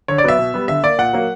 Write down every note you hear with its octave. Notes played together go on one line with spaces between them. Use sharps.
D3 C#5
D5
F#3 B3 E5
B2
G3 B3
D3 E5
A#3 D5
A#2 F#5
F#3 A#3